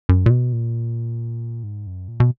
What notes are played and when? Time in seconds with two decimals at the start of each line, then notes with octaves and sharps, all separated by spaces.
0.09 F#2
0.26 A#2
0.30 B2
0.53 A#2
1.63 G#2
1.87 F#2
2.08 A#2
2.20 B2